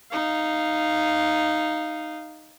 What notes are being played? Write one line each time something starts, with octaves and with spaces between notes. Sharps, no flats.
D#4 F5